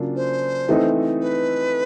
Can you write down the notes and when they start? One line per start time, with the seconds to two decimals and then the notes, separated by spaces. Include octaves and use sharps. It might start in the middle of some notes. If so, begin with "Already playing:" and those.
Already playing: C#3 F#3 A#3 D4 F4
0.16 C5
0.68 E3 A3 C4 D#4
1.21 B4